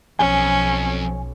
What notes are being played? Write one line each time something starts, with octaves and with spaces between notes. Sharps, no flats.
B1 F2 C#4 G#5